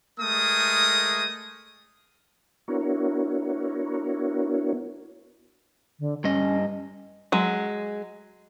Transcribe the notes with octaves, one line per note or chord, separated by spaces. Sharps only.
G#3 A3 A#4 D#6
B3 D4 E4 F#4 A#4 C#5
D3
G2 C#4 D#5
F#3 G#3